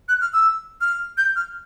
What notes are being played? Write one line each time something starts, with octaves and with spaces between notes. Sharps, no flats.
F#6
F6
E6
F6
G6
F6